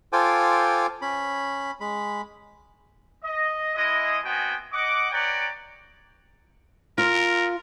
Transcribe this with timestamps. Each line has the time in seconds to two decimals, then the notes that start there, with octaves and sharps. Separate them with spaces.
0.13 F4 A4 C5 G5 G#5 D6
1.02 C#4 B5
1.80 G#3 B5
3.23 D#5
3.75 G#3 E4 D#5
4.24 B3 C4 F#4 G5 G#5
4.72 D#5 F#5 D6
5.11 B4 C#5 D5 F#5 G5 A#5
6.98 F4 A#4